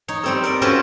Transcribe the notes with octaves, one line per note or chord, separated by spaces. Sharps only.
D#4 C#5
G3 C4 A4
A#4 D5
C4 C#4 F4 F#4 A4 B4